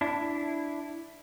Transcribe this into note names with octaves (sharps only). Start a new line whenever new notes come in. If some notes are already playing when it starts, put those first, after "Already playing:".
D4 E4